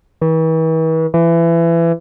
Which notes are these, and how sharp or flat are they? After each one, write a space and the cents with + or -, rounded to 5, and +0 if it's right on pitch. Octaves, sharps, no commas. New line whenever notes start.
E3 -40
E3 +25